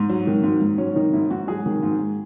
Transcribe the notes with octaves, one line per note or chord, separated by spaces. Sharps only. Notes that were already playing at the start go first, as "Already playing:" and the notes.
Already playing: G#2
F#3
D#3
G#2
G#2
F#3 C#4
D#3 D#4
G#2 E4
G#2 F#4
F#3 G#4
D#3
G#2